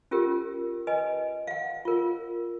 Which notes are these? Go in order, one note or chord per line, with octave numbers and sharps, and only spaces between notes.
C#4 F4 G4 A#4
B4 D#5 G#5
F5 F#5
F4 A#4